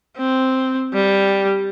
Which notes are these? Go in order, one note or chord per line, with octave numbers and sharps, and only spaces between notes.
C4
G3